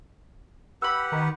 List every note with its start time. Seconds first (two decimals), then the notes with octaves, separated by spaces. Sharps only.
0.82 G4 B4 F#5 B5 E6
1.12 D#3